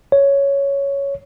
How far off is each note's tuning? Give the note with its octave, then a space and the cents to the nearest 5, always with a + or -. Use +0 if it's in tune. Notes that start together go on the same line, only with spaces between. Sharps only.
C#5 +5